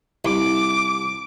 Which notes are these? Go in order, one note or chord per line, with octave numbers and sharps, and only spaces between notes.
C2 D6